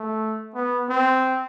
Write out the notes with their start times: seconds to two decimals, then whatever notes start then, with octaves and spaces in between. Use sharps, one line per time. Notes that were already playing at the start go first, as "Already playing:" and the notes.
Already playing: A3
0.55 B3
0.90 C4